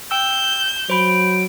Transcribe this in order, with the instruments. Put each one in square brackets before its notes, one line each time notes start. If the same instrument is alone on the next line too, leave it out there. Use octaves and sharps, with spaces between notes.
[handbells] G5 E6 [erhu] G6 [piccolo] E7
[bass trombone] F#3 [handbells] C5 B5 [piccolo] D7